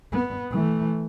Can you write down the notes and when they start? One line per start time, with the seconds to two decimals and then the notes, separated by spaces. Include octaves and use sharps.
0.12 B3
0.51 E3 A3